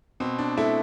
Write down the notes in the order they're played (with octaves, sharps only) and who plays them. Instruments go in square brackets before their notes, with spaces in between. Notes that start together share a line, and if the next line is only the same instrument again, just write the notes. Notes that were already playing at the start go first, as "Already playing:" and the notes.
[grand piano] B2 C4
D4
A3 E4